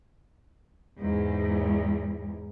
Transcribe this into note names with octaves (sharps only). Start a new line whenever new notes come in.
E2 G#2